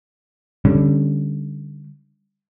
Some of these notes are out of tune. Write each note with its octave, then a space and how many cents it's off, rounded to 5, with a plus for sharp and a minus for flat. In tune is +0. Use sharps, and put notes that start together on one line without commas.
D3 +0 G3 +20 C#4 -15